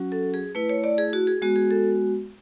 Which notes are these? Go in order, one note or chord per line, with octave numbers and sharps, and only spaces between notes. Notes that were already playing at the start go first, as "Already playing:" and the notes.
Already playing: F#3 C#4 F#4
A4
G#4
A3 E4 B4
C#5
D5
G#4
F#4
G#4
G#3 B3 F#4
G#4
A4